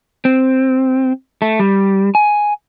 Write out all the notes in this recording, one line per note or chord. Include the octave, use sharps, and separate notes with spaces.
C4
A3
G3
G#5